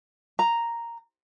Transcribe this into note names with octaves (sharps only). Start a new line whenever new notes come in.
A#5